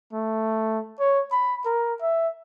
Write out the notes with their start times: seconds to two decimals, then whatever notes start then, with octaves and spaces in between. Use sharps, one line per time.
0.13 A3
1.00 C#5
1.32 B5
1.65 A#4
2.02 E5